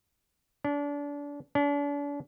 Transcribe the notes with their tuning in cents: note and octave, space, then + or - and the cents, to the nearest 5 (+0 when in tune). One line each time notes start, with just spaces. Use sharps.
D4 -30
D4 -40